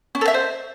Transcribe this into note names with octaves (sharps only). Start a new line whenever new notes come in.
C#4
A4
E5
C5